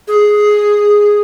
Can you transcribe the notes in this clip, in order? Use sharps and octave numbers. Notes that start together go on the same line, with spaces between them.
G#4